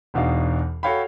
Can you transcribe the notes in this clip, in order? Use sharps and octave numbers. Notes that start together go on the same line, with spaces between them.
E1 E2 B2 D4 D#4 F5
F#4 A4 C#5 F5 G5 B5